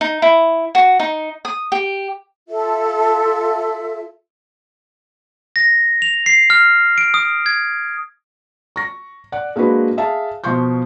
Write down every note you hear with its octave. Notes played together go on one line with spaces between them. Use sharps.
D#4
E4
F#4
D#4
D#6
G4
F4 A4 E5
A#6
F7
C7
F6
D7
D#6
G#6
C#6 A#6
D5 F#5
G#3 A#3 D4 F#4 B4
G#4 E5 F5 A5
B2 F3 F5 C6 C#6 G6